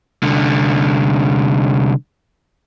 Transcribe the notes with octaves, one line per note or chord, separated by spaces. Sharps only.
C2 D3